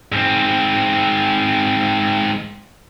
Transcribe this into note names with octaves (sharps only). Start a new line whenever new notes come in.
G#2 C4